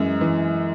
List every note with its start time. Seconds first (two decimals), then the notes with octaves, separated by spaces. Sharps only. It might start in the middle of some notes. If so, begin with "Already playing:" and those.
Already playing: F#2 E3 G#3
0.21 E3